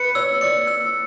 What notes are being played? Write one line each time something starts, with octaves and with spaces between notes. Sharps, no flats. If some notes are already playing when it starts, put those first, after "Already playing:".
Already playing: B4 C#7
C#5 E6
D5 C#7
E6